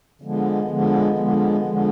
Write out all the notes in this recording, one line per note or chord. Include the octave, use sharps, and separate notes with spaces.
D3 F3 G#3 B3
D3 F3 G#3 B3
D3 F3 G#3 B3
D3 F3 G#3 B3